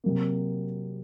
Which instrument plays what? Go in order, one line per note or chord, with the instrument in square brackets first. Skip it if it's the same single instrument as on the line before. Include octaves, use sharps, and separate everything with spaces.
[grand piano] C3 F#3 A#3